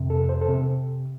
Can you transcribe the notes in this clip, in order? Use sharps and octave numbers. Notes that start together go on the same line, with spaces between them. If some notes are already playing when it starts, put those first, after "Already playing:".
Already playing: F2 C3
A4
C5
A4
C3